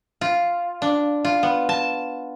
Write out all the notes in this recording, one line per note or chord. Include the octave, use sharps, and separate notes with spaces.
F4
D4
F4
B3
A5